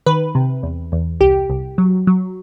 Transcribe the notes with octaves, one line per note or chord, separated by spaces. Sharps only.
D#3 B4
C3
E2
E2
C2 G4
C2
F#3
F#3